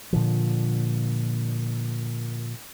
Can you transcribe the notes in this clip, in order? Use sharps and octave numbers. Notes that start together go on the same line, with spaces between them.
A#2 D3 F3